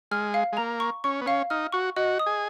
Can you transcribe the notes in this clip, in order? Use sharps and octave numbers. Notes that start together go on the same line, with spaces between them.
G#3 F6
F5
G#3
A#3 A#5
C#6
C#4 C#6
B3
C#4 F5
D#4 F6
F#4 C#6
F#4 D#5
D#6
G#4